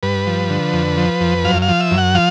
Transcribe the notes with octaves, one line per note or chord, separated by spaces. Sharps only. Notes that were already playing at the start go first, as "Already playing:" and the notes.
G2 B4
F3
D3
F2
F3
F2
F#2 F5
F5
F3
E5
F#2
F#5
F3 F5